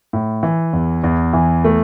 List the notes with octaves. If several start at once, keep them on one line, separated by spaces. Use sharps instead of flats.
A2
E3
E2
E2
E3
A3